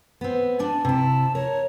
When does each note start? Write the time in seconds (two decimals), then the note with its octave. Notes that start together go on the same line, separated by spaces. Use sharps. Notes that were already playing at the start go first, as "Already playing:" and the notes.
0.21 B3 C4
0.59 D4 D5 G#5 A5
0.85 C3 E4
1.35 A#4 C#5